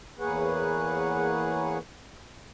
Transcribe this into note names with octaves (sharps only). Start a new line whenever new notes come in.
E2 A#3 G#4 B4 C#5 F#5